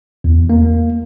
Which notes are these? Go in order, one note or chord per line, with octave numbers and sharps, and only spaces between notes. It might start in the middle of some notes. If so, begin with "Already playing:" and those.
E2
A#3